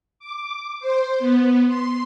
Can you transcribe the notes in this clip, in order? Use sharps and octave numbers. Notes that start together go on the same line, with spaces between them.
D6
C5
B3
C6